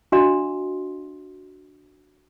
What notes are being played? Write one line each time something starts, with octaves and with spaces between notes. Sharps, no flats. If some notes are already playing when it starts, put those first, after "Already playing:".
D4 F#4 D#5 F5 A#5 C6